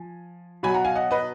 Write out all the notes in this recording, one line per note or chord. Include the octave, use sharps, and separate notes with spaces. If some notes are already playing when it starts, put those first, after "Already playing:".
Already playing: F3 G#5
B2 F#3 G#5 B5
F#5 A#5
F5 G#5
D#5 F#5
B4 D#5